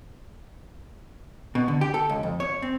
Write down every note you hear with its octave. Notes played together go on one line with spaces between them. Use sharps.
B2
D3
G4
A4
C#2
F2
C#5
C4